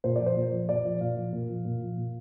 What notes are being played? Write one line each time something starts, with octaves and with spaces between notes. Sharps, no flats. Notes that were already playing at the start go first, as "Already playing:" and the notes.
A#2 C5
F3 D5
C5
A#2
F3
A#2 D5
F3
A#2 F5
F3
A#2
F3
A#2
F3
A#2